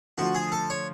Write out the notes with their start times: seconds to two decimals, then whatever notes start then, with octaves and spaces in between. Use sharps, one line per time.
0.18 D3 F3 A3 F4 F#4
0.35 G#4
0.52 A4
0.70 C#5